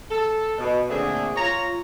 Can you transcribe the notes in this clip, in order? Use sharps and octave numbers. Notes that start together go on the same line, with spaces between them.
A4
B2
A#2 D3 A3 C4 D4 G#4
F4 C#5 A#5